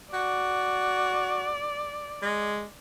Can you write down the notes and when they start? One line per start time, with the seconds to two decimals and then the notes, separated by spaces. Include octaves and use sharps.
0.13 F#4 D5
2.22 G#3